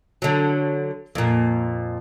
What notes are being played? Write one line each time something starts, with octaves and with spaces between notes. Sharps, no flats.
D3 F#3
F2 A#2